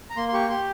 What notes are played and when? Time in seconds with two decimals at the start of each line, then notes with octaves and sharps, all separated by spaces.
0.10 A#5
0.17 A#3 C6
0.29 C6
0.33 G4 C#6
0.49 G4 C6